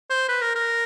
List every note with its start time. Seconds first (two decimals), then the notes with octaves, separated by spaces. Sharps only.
0.10 C5
0.29 B4
0.42 A#4
0.55 A#4